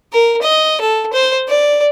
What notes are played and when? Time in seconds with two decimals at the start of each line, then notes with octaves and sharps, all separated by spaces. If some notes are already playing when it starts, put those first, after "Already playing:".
0.13 A#4
0.42 D#5
0.81 A4
1.13 C5
1.48 D5